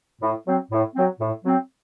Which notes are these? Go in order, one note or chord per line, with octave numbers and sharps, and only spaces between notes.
A2
F#3 C4
A2
F#3 C4
A2
F#3 C4